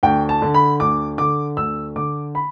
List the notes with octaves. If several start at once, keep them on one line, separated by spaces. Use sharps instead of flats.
D2 G5
A5
D3
B5
D2 D6
D3 D6
D2 E6
D3 D6
B5